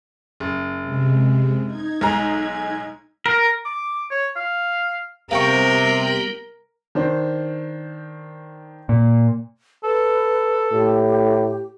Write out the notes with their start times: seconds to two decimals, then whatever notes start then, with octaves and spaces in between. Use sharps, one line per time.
0.40 F#1
0.82 C3 G#3
1.64 D#4 G#6
2.01 B1 G#3 A#5
3.26 A#4
3.65 D6
4.11 C#5
4.36 F5
5.31 C3 G3 B3 G4 A#4 F5 G5 C#6
6.95 D#3 D4 C5
8.89 A#2
9.84 A4 B4
10.72 A2 G4